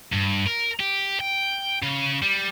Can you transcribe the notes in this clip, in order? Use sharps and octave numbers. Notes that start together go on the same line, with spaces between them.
G2
A#4
G4
G5
C#3
G3